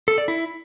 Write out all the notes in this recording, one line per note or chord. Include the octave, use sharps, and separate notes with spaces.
A4
D5
E4